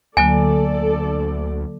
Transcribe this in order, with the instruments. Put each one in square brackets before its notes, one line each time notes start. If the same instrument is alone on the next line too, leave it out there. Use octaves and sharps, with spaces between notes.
[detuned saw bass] D2 [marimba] D3 F#3 A#3 [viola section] A4 D5 [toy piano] G#5